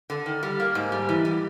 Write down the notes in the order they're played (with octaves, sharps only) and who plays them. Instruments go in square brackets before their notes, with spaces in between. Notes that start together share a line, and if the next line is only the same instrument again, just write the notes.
[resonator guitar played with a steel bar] D3
D#3
G3
A#3
G#2
G3
E3
G3